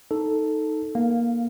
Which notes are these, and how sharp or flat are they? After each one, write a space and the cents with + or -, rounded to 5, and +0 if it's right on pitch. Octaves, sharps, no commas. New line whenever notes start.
D#4 +5 A4 +0
A#3 +15 F5 +0